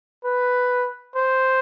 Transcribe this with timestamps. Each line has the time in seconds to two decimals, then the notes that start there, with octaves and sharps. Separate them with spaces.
0.25 B4
1.15 C5